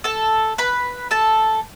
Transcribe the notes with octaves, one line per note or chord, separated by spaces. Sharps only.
A4 A5
B4 B5
A4 A5